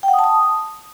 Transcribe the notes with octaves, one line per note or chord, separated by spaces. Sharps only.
G5
F#5
D#6
A5
D#6